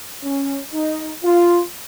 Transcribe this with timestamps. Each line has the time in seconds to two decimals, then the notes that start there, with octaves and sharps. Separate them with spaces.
0.23 C#4
0.73 D#4
1.24 F4